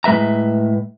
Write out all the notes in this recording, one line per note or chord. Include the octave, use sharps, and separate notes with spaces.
A2 G#3 B4 E5 A#5